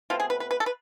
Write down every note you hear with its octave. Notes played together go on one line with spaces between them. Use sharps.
B2 A3 C4 F4
G#4
B4
B4
B4
A4
B4